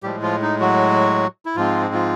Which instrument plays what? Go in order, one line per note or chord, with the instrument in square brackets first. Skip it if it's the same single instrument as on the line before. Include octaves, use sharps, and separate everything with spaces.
[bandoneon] A2 F3 G3 G#3 G4
F3 F4
D#4
F#3 F#4
E4
G#2 F3 G#3 C4 F4
F3 F4